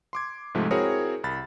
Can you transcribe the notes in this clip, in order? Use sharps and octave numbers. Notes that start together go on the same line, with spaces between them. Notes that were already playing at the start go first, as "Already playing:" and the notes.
C6 D6 G#6
G#2 C3 F3 G#3 A3
C4 E4 F#4 G#4 A#4 C#5
C2 B5 A6